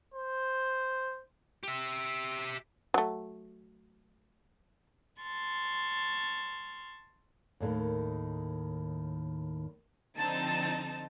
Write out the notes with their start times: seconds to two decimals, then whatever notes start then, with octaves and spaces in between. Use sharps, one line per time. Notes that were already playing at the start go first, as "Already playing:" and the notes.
0.14 C5
1.63 G4 E5
2.94 F#3 A3
5.21 A5 C6 C#6 F6
7.60 D#2 A2 D3 D#3
10.17 D3 F3 C4 D#4 A5